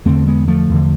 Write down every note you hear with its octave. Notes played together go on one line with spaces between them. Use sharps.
E2 D3 A3 C4
G#3 B3
F3 A3
E2 D3